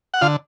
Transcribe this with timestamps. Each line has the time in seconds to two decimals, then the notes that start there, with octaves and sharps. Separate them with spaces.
0.14 F#5
0.21 D3 F4 F5